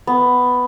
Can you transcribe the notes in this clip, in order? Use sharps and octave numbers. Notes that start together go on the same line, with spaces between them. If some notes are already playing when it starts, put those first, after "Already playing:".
B3